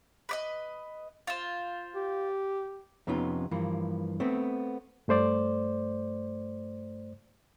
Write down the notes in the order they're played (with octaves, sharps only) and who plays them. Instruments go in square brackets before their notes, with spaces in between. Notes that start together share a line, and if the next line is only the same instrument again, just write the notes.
[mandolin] B4 D5 D#5
F4 C5
[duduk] G4
[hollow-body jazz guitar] F2 C3 B3 C#4 D#4 F4
G2 E3 F3 A#3
A3 B3 C4
[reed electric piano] G2 A3 C5 D5